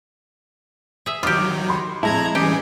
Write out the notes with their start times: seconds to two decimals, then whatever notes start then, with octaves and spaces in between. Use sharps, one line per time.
1.06 G#4 E5
1.23 D#3 F#3 F4 G4 D6 D#6 G6
1.68 B5 C6
2.03 F2 A2 G#3 E4 A5 A#5 G#6
2.35 E3 G3 C#4 G4 G#4